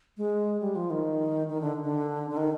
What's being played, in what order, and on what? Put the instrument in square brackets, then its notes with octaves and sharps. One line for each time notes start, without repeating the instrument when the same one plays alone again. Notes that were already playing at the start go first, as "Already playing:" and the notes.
[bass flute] G#3
G3
F3
D#3
D#3
D3
D3
D3
D#3